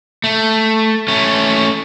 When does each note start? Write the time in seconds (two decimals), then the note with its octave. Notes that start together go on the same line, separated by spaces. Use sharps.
0.24 A3
1.08 A3 C#4